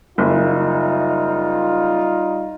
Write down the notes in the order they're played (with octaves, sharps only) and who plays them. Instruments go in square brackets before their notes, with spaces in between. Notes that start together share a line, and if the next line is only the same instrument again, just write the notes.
[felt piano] F#1 [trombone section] G3 D#4 F4